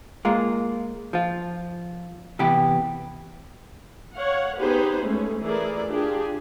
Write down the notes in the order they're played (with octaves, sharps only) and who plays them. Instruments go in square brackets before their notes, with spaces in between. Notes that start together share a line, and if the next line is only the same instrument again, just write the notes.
[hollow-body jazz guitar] G#3 A#3 F4
F3 F4
C3 E3 B3 G4
[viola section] C#5 F5 F#5
B3 D#4 G4 G#4 B4 C5
G#3 A3 C#4
E3 A3 E4 G#4 A#4 D5
D4 F4 G4 G#4